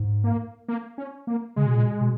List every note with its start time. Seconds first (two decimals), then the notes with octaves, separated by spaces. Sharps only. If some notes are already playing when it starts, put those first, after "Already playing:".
Already playing: G#2
0.24 A#3
0.68 A#3
0.98 C#4
1.27 A#3
1.56 C#3 G#3
1.66 B2
1.74 A#2
1.83 B2
2.01 B2